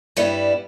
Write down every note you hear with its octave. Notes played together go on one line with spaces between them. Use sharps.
G2 G3 B3 E4